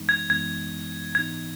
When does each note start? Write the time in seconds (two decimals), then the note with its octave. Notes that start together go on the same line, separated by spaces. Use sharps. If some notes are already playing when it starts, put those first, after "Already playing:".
Already playing: F#2 E3 G#3 B3 D#4
0.09 G#6
0.30 F#2 E3 G#3 B3 D#4 G#6
1.15 G#2 E3 B3 D#4 G#6